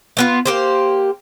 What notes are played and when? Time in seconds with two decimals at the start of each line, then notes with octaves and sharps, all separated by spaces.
0.17 A3 B3 F4
0.46 A#3 G4 C5